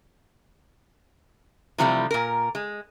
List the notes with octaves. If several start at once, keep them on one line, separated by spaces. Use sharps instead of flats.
C3 E3 F3 G3 A3 C4
A#2 A#4
G#3